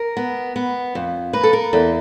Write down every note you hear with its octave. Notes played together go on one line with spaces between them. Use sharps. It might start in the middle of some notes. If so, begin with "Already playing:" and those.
Already playing: A#4
B3
B3
F2
A#3 B4
A4
A#4
E2 A4